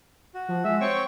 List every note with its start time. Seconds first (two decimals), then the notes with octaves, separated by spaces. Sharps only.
0.35 F#4
0.49 F3
0.65 G#3 E5
0.81 C4 C#5 G5 C#6